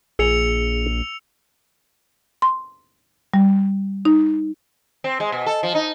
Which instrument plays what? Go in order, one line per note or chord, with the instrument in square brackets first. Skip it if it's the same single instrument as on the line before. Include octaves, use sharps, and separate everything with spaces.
[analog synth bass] A#1 [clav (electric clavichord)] G#4 [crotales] E6 C#7 F7
[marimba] C6
G3
D#4
[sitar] C4
G#3
B2
A4
F3
D#4